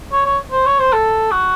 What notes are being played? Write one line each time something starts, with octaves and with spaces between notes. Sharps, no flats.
C#5
C#5
C5
C#5
C5
A4
F#4